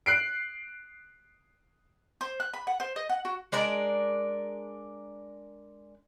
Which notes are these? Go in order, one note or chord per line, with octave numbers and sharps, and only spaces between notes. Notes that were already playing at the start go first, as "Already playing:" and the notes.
F#6 C7 D7
C5
F#6
B5
F#5
C5
D#5
F#5
F#4
G#3 D4 A#4 D5